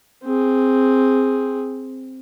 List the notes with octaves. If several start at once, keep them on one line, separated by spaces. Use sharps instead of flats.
C4 G#4